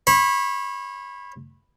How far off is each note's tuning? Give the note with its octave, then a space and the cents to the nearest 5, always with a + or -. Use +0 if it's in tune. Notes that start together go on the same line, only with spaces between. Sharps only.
C#5 -35 B5 +0